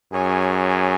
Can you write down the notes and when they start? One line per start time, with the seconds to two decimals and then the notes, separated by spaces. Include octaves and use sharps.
0.12 F#2 G#4 C#5 G#5